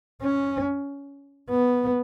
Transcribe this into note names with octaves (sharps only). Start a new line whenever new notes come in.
C#4
B3